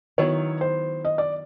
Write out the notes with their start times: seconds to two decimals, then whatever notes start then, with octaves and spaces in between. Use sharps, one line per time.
0.18 D#3 F#3 B3 E4 C#5
0.61 C5
1.05 D#5
1.18 D5